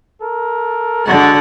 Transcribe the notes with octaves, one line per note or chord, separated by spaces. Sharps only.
A4 A#4
D3 G#3 F#4 F#5